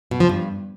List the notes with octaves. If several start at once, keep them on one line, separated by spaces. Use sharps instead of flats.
B2
F3
G2